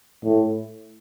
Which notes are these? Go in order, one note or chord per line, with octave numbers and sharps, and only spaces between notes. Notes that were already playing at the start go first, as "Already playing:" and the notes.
A2